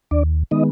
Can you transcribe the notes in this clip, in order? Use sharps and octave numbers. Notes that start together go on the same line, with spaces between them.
D#2 D4 D5
D#3 G#3 B3 D#4 D#5